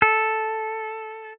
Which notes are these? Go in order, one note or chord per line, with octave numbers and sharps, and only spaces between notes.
A4